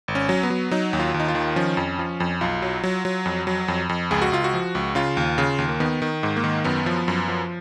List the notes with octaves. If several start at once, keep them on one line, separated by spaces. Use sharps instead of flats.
G#1
C#4
F#3
B3
F#3
F#3 D#4
D#2
F4
D#2
D#4
F4
D#3
F3 C#4
F2
F3
F2
B1 F4
F#3
F#3
F#3
F2
F#3
F2
F2
C#2 G#4
F#4
C#2 F4
F#4
F3
C#2
C#3 F4
D#2
C#3
D#2
A#3
D#3 B3
D#3
G#2
A#3
D#3
F#2 B3
F3
F#2
F3